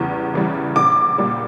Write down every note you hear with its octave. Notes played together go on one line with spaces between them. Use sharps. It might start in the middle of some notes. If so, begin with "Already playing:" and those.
Already playing: E2 C#3 E3 G3
C#3 E3 G3
A#1 D6
A#2 G3